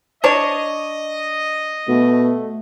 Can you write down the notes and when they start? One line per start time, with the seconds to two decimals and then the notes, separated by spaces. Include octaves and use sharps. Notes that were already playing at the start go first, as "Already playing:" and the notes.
0.24 D4 C#5 D#5
1.88 B2 A3